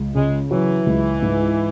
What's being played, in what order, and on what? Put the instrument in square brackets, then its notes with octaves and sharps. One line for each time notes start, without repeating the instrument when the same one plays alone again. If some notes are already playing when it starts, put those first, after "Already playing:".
Already playing: [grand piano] C#2
[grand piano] C#3 [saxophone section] G#3
[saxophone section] E3 [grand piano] F#3
[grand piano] C#2
G#2